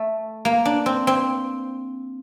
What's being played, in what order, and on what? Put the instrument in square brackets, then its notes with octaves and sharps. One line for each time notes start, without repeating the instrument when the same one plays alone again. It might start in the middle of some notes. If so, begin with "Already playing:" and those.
Already playing: [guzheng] A3
A#3
D4
C4
C4